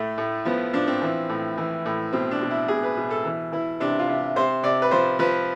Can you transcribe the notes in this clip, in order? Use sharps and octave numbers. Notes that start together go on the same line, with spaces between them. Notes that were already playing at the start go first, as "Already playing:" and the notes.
Already playing: A2 A3
A2
F3 B3
F3 D4
C4
E3
A2
E3
A2
B2 C4
D4
B2
E4
B2 G#4
B4
B2
A4
E3
E3 E4
C3 D4
F4
C3
C3 C5
C3 D5
B4
F3 C5
F3 B4